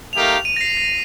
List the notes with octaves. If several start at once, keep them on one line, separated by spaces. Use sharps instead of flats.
A3 D#4 G4 A#4 F5 F7
D#7
A#6
C7
A#6